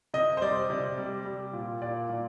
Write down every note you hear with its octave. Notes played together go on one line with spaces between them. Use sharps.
C3 D#5
C5
G3 D5
C3
G3
G3
A#2
A#2 D5
A#2